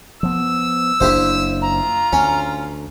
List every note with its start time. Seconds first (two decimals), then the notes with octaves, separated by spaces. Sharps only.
0.23 F3 B3 E6
1.00 F#1 A#3 D4 E4 G4 C5
1.62 F4 A#5
2.13 D2 C#4